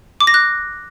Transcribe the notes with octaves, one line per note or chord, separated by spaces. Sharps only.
D6
A#6
F#6